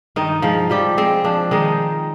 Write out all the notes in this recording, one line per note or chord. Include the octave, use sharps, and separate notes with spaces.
G2 D#3 D#4
F3 G#3 F4
F3 G3 G4
G#3 C4
F3 D4
D#3 G#3 D#4